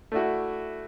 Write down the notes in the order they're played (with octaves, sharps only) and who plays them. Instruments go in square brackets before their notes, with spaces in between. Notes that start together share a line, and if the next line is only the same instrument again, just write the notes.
[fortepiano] A3 D4 E4 F#4